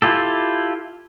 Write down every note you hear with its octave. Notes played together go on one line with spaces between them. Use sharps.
E4 F4 G4 A4